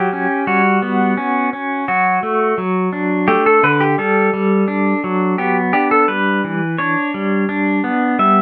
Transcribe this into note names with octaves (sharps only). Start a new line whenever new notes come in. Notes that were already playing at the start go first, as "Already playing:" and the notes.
Already playing: F#3 G4
C#4
G3 F#4
B3
C#4
C#4
F#3 F#4
A3
F#3
D4
A3 G4
A4
D3 B4
G4
G3 A4
G3
D4
F#3
B3 G4
D4 G4
A4
G3 B4
E3
D4 C#5
G3
D4
B3
G3 E5